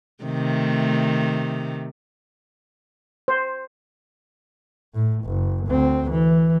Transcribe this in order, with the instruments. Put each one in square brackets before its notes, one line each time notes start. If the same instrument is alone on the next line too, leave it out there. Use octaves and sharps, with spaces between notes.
[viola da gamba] C3 D#3 A3
[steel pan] C5
[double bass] A2
F#1
D2 C4
E3